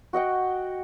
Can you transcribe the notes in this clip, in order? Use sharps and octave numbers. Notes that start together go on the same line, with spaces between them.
F#4 D#5 F#5 G5